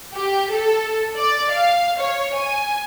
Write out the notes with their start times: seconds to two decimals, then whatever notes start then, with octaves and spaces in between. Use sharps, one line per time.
0.14 G4
0.51 A4
1.16 D5
1.50 F5
2.00 C#5
2.34 G#5